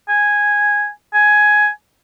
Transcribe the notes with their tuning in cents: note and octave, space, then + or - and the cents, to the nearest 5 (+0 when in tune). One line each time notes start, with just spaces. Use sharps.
G#5 -5
G#5 +10